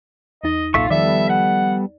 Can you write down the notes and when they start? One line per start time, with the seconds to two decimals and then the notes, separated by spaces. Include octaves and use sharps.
0.44 E2 D#4 D#5
0.74 B1 A#2 F4 A4 E5 C#6
0.90 D#3 F3 G3 B3 A4 D5 E5
1.29 F#5